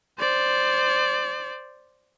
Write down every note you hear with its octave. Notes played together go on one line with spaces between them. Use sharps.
C5 D5